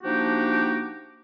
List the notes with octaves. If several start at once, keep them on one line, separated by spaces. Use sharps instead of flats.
F3 A#3 D4 D#4 F#4 G4